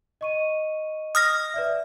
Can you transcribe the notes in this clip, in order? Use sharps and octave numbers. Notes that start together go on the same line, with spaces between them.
D#5 C#6 D#7
D#6 F6 A#6
B4 D5 E5